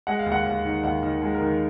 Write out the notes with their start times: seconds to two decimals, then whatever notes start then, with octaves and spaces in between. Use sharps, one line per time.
0.07 G#3 F#5
0.19 F5
0.26 D#2
0.32 F#5
0.46 D#2
0.65 D#3
0.84 D#2 F#5
1.03 D#3
1.22 G#3
1.34 A#4
1.41 D#3